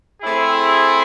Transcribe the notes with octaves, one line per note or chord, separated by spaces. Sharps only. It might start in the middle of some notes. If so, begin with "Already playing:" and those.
A3 C4 E4 G#4